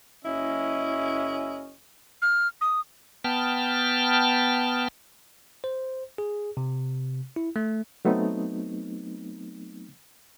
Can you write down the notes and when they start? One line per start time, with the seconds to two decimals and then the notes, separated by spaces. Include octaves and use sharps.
0.25 F#1 C#4 E4 D#5
2.22 F6
2.61 D#6
3.24 B3 G5 A5 F6
5.64 C5
6.18 G#4
6.57 C3
7.36 E4
7.56 A3
8.05 F#3 A3 B3 C4 D#4